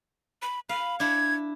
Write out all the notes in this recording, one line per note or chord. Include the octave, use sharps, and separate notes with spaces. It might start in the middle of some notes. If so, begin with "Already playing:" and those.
B5
F5 B5
D4 E4 G#6